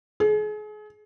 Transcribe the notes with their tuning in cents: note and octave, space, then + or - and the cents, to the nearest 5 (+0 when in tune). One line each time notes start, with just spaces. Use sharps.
G#4 +35